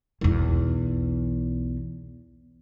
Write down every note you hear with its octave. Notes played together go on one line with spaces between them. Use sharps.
B1 E2